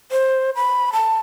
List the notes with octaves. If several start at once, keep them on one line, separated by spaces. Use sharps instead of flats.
C5
B5
A5